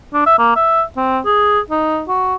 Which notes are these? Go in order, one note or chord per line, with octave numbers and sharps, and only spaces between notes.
D4
E5
A#3
E5
C4
G#4
D#4
F#4